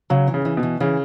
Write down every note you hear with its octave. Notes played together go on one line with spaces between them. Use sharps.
C#3 F#3
E3
C#3
E3
B2
E3
C#3 E3